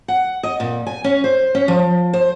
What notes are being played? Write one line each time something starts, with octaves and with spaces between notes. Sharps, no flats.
F#5
D#5
A#2
G#5
C#4
C5
C#4
F3
C5